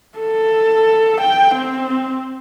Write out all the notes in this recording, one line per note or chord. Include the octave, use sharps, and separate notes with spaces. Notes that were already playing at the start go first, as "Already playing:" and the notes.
A4
G5
C4